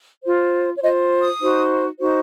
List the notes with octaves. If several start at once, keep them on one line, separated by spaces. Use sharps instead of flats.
F4 C5
C#5
F4 C5 D#5
D#6
D#4 F#4 C5
D#4 F#4 C5